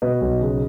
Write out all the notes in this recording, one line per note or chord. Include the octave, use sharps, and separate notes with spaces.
B2 B4 D#5
B1
C#3